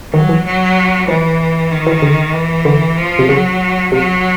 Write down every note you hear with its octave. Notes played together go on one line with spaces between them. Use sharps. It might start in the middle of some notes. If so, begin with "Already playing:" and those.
D#3 F#3
E3
F#3
E3 F3
D#3
E3
D3
E3
D3
F3
C3
C#3 F#3
C3 F#3